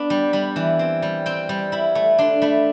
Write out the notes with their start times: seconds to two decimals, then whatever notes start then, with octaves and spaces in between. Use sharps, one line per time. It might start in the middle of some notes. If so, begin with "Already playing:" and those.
Already playing: B3 D4 B5
0.10 G3
0.33 G3 B5
0.56 E3
0.79 C4
1.02 G3
1.26 C4 G5
1.49 G3
1.72 E4 B5
1.95 A3
2.18 D4 C6
2.42 A3 B5